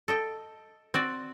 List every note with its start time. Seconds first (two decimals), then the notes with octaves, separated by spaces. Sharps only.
0.08 A4 D#5 G5
0.94 C4 F#4 D5